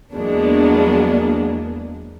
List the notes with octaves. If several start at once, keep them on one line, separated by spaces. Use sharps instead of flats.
E2 F#3 G#3 A#3 B3 D4